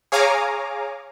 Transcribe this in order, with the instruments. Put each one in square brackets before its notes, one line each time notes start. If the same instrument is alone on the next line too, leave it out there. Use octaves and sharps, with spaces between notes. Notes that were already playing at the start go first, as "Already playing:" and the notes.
[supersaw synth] G#4 C#5 F5 G#5 A#5 D6